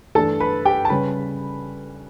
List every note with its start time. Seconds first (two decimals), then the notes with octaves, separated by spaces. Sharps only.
0.15 G2 E3 A3 D4 A4 A5
0.40 B4 B5
0.65 G4 G5
0.85 A5
0.90 C#3 G3 C#4 B4 B5